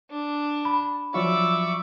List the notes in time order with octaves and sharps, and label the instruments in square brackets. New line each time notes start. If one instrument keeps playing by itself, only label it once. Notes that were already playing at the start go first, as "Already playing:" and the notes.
[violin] D4
[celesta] B5
[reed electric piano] F3 F#3 F4 [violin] D5 D6 [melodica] E5 C#6 E6